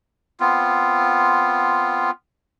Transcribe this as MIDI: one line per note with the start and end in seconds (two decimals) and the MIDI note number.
0.40 2.11 59
0.40 2.11 60
0.40 2.11 65